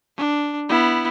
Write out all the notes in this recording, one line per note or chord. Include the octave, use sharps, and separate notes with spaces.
D4
B3 E4